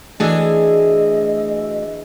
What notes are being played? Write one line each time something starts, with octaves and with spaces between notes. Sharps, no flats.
E3 A3 D4 F#4 G#4 D#5 E6